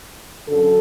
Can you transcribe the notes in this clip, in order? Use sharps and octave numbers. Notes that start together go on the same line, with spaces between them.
F#2 D3 A4